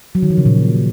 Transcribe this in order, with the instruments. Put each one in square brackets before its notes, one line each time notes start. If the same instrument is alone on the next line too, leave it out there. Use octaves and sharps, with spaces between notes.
[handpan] F#3
D#3
F3
C#3
A#2